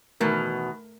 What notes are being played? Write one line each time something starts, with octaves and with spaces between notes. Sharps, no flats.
E2 B2 D#3 A3 A#4